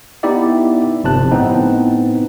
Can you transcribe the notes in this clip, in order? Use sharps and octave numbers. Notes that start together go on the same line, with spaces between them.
B3 D#4 E4 G4 D5 E5
G1 C3 F3 A5 F#6
A2 B3 C4 D#4